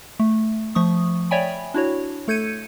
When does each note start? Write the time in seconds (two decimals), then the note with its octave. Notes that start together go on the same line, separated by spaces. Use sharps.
0.20 A3
0.75 F3 A3 C#6 D#6
1.31 C#5 D5 E5 G5 G#5 B5
1.74 D4 E4 F#4 C#5
2.28 A3 A4 G6 G#6 C#7 D#7